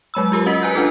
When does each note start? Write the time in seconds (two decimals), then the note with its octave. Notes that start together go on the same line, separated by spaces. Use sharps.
0.14 F#3 G#3 B5 E6
0.32 F4 G4 A#4
0.46 C#4 F#4 D#5 E6 B6
0.62 B4 G#5 A#5 F#6 G6 B6
0.74 C#4 D4 F4 A4 B4